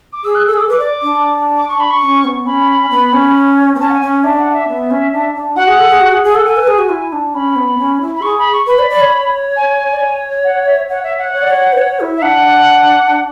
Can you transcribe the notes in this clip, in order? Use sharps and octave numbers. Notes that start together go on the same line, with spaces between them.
D6
G#4 E6
F#6
A4 E6
G#4
D6
A4
B4 D6
D5
D4
D6
C#6
B5
C#6
C#4
B3
C#4 B5
B3
C#4
B3
C#4 A5
F#5
G#5
C#4
D4 E5
F#5
E5
B3
C#4
D4
D4
F#4 F#5
G#4
A4
G#4
F#4
G#4
G#4
A4 F#5
A4 G#5
B4
G#4
F#4
E4
D4
C#4 B5
B3
C#4
E4
B5
G#4 C#6
B5
C#6
B4 B5
D5
D5
C#5
G#5
D5
C#5
F#5
E5
C#5 F#5
E5
F#5
C#5
D5
C#5
B4
C#5
E4
E5
D4 F#5